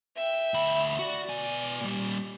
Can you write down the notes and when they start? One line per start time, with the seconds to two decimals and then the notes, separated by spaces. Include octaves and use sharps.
0.16 E5 G5
0.54 D2 B5
0.99 F#4 D5
1.29 B2 G#5
1.81 A#2 G3